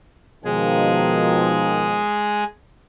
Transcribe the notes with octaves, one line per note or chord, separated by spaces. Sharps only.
B2 D#3 F3 G#3 G#4